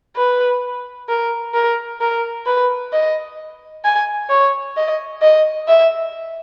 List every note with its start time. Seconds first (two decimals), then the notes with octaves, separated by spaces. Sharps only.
0.16 B4
1.09 A#4
1.54 A#4
2.01 A#4
2.46 B4
2.93 D#5
3.84 G#5
4.30 C#5
4.77 D#5
5.22 D#5
5.68 E5